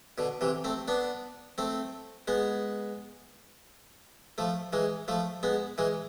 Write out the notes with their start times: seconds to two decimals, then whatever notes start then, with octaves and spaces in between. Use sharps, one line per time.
0.18 B2 D3
0.41 C3 E3
0.64 A3 C4
0.88 B3 D4
1.58 A3 C4
2.28 G#3 B3
4.38 F3 A3
4.73 E3 G#3
5.08 F3 A3
5.43 G#3 B3
5.78 E3 G#3